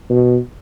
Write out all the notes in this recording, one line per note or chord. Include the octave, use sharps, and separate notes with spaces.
B2